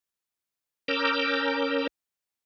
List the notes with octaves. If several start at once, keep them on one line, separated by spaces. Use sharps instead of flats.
C#4 A#4 A#5 D6 E6 G6